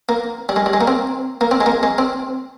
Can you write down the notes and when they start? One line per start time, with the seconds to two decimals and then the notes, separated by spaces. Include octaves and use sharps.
0.09 A#3
0.49 G3
0.56 G#3
0.66 G3
0.73 G#3
0.81 A#3
0.88 C4
1.41 A#3
1.51 C4
1.61 G#3
1.66 A#3
1.83 G#3
1.98 C4